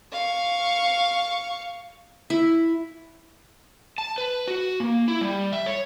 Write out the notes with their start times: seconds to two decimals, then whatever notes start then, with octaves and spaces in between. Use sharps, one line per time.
0.13 F5 C#6
2.30 E4
3.98 A5
4.18 B4
4.48 F#4
4.80 A#3
5.08 E4
5.21 G3
5.53 E5
5.66 C#5